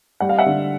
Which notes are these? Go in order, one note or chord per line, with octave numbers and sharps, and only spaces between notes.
G3 F#5
F5
E5 F#5
D3